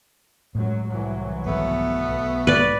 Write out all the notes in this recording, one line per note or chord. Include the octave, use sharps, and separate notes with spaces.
F#2 A2 F#3 G#3
C2 E3 F#3
G#1 B2 A3 B3
B1
G#2 B4 D5